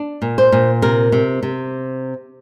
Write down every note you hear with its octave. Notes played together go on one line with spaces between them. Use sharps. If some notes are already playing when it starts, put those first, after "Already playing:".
Already playing: D4
A#2
C5
A#2
C3 A#4
C3
C3